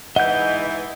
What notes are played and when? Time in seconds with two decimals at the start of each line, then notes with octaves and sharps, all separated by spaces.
0.16 G#2 E3 D#5 F#5 G6